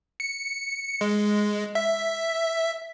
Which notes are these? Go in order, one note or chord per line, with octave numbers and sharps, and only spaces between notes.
C#7
G#3
E5